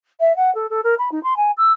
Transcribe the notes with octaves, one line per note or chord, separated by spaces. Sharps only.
E5
F#5
A4
A4
A#4
B5
D#4
C6
G#5
E6